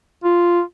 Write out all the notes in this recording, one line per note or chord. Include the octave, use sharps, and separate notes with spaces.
F4